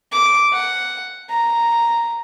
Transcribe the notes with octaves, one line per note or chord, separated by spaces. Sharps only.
D6
F#5
A#5